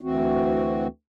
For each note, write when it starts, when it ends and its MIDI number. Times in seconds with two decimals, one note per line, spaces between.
0.01 0.87 38
0.01 0.87 52
0.01 0.87 60
0.01 0.87 66